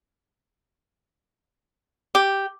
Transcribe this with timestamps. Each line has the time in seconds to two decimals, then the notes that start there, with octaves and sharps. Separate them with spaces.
2.15 G4